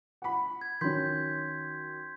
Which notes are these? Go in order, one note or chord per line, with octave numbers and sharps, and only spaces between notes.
F#5 B5
G#6
D#3 F#3 C#4 C6 G6 B6